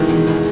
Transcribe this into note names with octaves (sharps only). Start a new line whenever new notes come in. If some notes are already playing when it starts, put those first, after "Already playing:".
Already playing: B2 D#3 E3 G#3
E2
B2 G#3